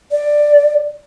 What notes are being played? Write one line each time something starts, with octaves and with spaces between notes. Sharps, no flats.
D5